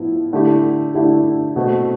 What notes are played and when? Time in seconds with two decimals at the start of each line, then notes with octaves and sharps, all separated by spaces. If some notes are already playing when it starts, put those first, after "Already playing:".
Already playing: A2 F3 B3 E4
0.33 D3 A3 E4 G4
0.94 D3 A3 E4 G4
1.56 B2 A3 C4